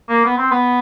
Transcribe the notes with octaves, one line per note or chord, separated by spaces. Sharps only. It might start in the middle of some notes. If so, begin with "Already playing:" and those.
A#3
B3
C4
B3